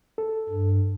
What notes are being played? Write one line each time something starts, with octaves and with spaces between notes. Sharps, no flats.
A4
G2